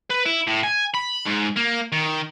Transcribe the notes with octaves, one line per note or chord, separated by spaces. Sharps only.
B4
E4
A2
G#5
B5
G#2
A#3
D#3